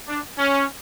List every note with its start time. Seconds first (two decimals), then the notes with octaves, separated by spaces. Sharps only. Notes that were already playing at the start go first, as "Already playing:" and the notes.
0.09 D4
0.38 C#4